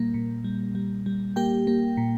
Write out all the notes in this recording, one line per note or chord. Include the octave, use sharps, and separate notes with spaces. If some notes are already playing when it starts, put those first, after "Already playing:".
Already playing: A#2 G3 A#3
A#2
G3
G3
G3
A#3 G4 G5
A#3
A#2